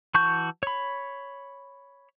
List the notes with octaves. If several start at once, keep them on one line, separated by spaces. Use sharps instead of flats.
E3 F#4 A5 C#6 G6
C#5 B5